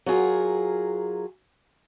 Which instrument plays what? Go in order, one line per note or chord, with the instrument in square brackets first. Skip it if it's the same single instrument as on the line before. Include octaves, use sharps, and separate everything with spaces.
[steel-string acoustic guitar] F#3 F4 G#4 A#4